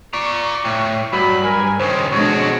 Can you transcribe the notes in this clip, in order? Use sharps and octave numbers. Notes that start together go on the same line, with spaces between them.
D5 A#5 C#6
A2 G5
G2 F#3 B5
A#4 G#5
C#2 D#3 C5 C#5
F2 B2 G#3 D4 F#4 C#5